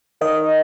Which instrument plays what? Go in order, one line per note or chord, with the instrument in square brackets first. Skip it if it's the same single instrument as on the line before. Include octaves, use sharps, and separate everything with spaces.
[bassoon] D#3 [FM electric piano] D#5